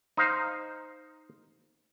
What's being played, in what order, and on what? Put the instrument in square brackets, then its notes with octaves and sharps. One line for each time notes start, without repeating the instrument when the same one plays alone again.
[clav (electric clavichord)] D#4 C5 F5